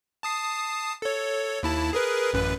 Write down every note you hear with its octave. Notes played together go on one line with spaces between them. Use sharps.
A5 D#6 C7
A4 C#5
D#2 E4 A5
G#4 A#4 B4
A1 F#2 B4